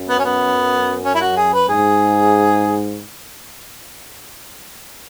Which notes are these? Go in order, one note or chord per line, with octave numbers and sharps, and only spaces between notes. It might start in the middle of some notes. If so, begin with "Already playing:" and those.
Already playing: F#2
B3
C#4
B3
C#4
E4
F#4
G#4
B4
G#2 G#4